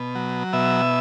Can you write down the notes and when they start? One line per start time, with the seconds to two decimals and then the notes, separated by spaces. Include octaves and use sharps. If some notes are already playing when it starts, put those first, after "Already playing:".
Already playing: B2
0.15 F#3
0.53 B2 E5